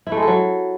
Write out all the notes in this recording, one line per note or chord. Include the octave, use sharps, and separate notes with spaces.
E4
A3
G#3
A4
F#3